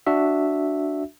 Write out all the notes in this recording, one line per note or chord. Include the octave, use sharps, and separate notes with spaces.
D4 F#4 E5